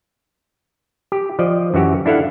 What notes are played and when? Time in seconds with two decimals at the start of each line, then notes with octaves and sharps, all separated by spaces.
1.12 G4
1.39 F3 D5 D#5
1.74 F#2 E3 F#4 G4
2.06 D4 E4 A4 F5 F#5